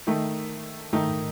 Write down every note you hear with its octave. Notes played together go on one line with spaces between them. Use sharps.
D#3 A3 D#4
D#3 A3 D#4